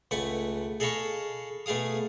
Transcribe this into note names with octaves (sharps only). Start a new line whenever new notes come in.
C#2 A3 B4 F#5 G#5
G#4 A4 D#5 F5 B5 C#6
B2 A3 G#4 F5 D#6